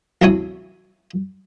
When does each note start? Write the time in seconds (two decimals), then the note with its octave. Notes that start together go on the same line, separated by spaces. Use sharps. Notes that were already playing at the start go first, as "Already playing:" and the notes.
0.22 A1 D2 C3 E4 C#5 D#6